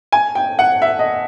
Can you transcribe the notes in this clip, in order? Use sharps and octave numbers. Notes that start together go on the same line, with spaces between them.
G#5
G5
F#5
E5
D#5